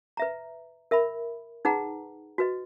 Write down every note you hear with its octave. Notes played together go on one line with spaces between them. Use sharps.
B4 E5 A#5
A#4 E5 B5
D#4 G#4 B4 F#5 A#5
F#4 B4 D#5